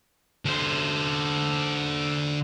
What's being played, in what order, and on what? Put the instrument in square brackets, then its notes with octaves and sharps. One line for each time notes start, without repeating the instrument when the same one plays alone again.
[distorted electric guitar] D3 C5